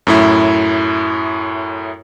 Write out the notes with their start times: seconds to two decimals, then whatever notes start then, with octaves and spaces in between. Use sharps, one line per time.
0.07 F#2 A2 E4